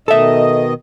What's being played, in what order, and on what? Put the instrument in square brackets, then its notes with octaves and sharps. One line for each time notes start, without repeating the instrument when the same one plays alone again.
[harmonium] B2 D#3 D#5 [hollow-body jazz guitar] A4 E5